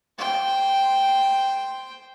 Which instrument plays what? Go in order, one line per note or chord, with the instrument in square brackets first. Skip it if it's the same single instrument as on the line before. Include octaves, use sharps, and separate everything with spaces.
[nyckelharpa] C5 G5